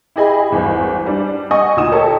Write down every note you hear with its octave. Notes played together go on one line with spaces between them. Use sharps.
E4 G4 G#4 D#5 G#5 B5
G#1 E2 G2
G3 D4
D#5 F#5 G#5 C#6 D#6
D2 A#2 D#4 D#6 E7
G4 A4 A#4 C#5 D#5 A5